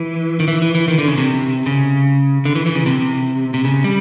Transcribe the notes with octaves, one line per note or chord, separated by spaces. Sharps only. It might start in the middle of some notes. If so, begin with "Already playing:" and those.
Already playing: E3
D#3
E3
E3
E3
D#3
D3
C#3
C3
C#3
D3
E3
E3
C#3
C3
C3
C#3
G3